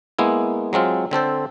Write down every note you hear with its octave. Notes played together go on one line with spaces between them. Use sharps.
G#3 A#3 B3 E4
F#3 G#3 C4 F4
D3 C4 A4 C5